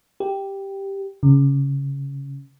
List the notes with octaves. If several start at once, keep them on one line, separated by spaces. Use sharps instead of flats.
G4
C#3